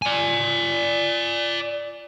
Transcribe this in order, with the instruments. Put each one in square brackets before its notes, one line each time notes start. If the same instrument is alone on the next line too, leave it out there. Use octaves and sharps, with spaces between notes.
[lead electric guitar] D5 G#5